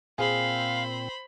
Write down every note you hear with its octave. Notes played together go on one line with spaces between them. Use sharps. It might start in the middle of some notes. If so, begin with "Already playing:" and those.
A#2 C4 G#4 C5 F5 B5